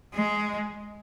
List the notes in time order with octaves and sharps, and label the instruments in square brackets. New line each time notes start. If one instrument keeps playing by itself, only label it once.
[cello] G#3